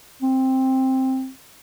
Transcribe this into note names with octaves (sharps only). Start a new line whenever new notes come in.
C4